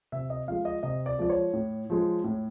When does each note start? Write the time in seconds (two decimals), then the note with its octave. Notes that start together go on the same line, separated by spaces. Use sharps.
0.12 C3 E5
0.30 D#5
0.48 F3 G#3 F5
0.65 D#5
0.83 C3 D#5
1.06 D5
1.19 F3 G#3 D5
1.30 C#5
1.53 A2
1.90 F3 G#3
2.24 A2